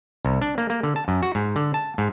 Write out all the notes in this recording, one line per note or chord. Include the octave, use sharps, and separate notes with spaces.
C2
D4
A#3
A#3
D3
A5
F#2
F#4
G#2
D3
A5
G#2